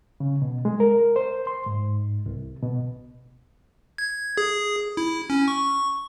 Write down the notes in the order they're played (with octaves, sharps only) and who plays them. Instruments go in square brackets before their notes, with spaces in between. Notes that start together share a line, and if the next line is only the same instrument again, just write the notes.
[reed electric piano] C#3
B2
G#3
A#4
C5
C6
G#2
C2
B2
[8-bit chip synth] G#6
G#4
E4
C#4
C#6